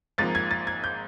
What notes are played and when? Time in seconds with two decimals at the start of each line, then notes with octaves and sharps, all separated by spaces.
0.18 G#1 G#2 F3 A#3 A6
0.35 G#6
0.51 A6
0.67 G#6
0.84 G6